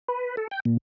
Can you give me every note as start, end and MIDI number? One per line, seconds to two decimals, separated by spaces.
0.08 0.36 71
0.37 0.47 69
0.51 0.60 79
0.65 0.77 46